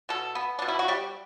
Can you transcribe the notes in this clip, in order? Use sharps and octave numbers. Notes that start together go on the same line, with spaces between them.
B2 A4
B3
B2 D4
E4
F#4
G3 G4